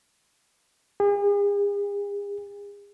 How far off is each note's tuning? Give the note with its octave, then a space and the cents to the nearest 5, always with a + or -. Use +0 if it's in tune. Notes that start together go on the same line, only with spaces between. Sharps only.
G#4 -40